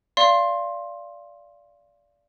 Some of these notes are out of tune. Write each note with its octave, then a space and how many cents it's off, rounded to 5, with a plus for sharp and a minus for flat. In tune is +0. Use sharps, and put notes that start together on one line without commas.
D5 -15 F5 -20 C6 +15